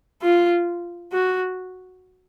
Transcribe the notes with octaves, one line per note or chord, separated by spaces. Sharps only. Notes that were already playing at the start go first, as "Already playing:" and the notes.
F4
F#4